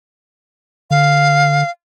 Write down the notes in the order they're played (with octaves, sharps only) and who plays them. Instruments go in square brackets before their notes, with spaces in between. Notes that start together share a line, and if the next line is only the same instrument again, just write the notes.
[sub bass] D3 [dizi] F5